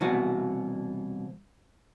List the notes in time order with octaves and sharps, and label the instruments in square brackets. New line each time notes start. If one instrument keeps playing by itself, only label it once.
[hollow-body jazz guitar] C2 B2 E3 F#4